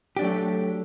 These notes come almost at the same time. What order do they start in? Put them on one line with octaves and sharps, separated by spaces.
G4 D4 F#3 A3